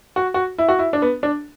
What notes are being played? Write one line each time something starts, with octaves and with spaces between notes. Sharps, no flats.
F#4
F#4
E4
F#4
E4
D4
B3
D4